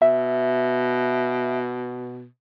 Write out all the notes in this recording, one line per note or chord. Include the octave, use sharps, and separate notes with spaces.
B2 E5